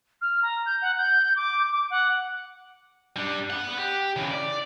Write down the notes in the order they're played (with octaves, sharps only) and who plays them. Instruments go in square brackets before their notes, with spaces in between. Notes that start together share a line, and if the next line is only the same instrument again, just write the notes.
[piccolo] F6
A#5
G6
F#5
G6
D6
D6
F#5
[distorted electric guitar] G3 D4
B3 F#5
G4
C#3 E3
D5